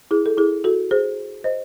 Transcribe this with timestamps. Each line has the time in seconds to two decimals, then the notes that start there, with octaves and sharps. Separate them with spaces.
0.11 E4 G#4
0.26 A4
0.37 E4 G#4
0.64 F#4 A4
0.91 G#4 C5
1.44 C5 D#5